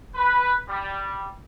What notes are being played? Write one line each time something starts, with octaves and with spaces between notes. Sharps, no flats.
B4
G3